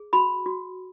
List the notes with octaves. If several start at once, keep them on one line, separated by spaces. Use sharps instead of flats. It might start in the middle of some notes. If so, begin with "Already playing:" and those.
Already playing: G#4
F#4 B5
F#4